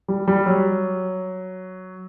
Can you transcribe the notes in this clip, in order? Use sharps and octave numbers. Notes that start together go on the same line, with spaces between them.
G3
G3
F#3